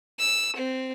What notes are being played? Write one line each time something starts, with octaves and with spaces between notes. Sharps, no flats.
E6
C4